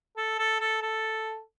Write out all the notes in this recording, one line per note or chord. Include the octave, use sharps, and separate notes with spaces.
A4
A4
A4
A4